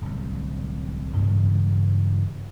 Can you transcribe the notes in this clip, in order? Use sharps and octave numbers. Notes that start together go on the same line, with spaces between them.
D1 C2
G2 C#3 E3 G#3